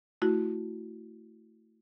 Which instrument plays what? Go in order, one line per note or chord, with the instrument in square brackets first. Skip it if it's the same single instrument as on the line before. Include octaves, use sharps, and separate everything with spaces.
[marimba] A3 E4 F#4